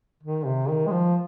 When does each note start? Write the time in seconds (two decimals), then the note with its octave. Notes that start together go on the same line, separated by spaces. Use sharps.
0.24 D#3
0.46 C3
0.70 D#3
0.87 G#3
0.91 F3